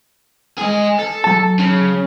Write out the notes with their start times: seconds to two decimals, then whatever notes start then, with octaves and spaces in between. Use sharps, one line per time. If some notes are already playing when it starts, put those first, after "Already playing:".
0.58 G#3 G#4
0.99 A4
1.24 F#3 A5
1.59 C#3